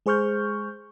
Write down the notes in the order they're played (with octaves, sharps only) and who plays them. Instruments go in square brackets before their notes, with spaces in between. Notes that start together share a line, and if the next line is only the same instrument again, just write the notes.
[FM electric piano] G#3 G#4 C5 C#6 F6 G6